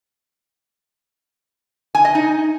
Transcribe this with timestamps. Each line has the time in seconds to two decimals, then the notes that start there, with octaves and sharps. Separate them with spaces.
1.95 G#5
2.05 D#5
2.15 D#4